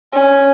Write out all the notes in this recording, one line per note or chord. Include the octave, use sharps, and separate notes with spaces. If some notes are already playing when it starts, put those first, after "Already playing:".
C#4